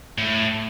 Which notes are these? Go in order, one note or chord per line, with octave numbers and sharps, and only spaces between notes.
A2